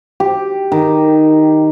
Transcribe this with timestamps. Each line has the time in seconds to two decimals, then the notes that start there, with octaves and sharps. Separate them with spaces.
0.20 G4
0.72 D#3